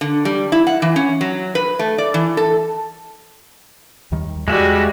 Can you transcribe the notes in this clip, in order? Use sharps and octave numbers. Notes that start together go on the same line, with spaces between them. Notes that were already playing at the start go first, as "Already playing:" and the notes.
D3
G3
E4
F#5
E3
C#4
F#3
B4
A3
D5
E3
A4
D#2 D#3 G3
E2 G3 G#3 F#4 E5